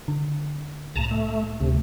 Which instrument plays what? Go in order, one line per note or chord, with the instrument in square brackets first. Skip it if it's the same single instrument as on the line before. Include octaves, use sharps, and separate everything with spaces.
[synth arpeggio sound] D3
[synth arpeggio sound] C2 A2 [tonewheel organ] A5 A#5
[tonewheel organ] A3
D2 C3